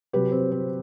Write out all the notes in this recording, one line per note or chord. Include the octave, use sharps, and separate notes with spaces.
C3 F#3 G4 B4
C4
C4